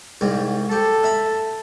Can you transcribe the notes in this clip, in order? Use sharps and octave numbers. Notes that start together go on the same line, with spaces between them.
C2 G#2
G4 A4
E5 A#5 B5